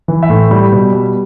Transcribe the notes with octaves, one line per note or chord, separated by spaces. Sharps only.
E3
E5
A2
G3
B2
G3